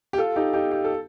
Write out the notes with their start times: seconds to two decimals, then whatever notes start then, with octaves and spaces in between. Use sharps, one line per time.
0.13 G4
0.18 F4 A4
0.36 D#4 G4
0.53 D#4 G4
0.71 G4
0.84 A4